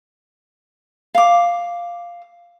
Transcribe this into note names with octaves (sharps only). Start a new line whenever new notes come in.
F5 D6